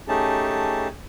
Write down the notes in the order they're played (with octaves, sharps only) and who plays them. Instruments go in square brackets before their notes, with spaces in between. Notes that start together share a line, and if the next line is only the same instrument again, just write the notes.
[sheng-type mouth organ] A3 C#4 D#4 G4 G#4 A5